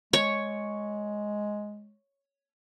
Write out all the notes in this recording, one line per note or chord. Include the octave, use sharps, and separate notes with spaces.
G#3 C#5